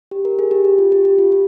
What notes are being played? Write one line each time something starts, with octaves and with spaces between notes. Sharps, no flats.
G4
A#4
G#4
G4
G4
F4
G4
G4
F4
F4